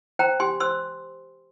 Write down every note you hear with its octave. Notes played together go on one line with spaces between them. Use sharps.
C5 G5 A#5
G4 G#5 C6
C5 C6 E6